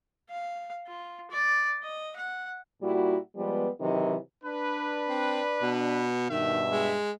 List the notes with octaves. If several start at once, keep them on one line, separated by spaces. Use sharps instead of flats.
F5
F4
D5
D#5
F#5
A#2 G3 E4 F#4
F3 G3 G#3 B3
C3 D#3 E3 F#3 E4 D#5
D4 B4
C4
B2
G2 B2 D#3 E5
G#3